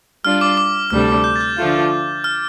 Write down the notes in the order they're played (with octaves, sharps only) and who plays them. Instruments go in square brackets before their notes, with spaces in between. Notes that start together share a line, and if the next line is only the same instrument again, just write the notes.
[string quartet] G3 D4 F4 D5 [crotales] F6
[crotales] D6
D6
[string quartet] D2 C3 G3 D4 A4 [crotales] F6
[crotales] G6
A6
G6
[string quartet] D3 F3 A3 F4
[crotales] F6